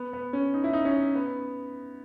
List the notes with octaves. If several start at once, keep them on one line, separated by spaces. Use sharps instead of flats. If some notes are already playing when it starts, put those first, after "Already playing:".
Already playing: B3
B3
C#4
D#4
E4
D#4
C#4
B3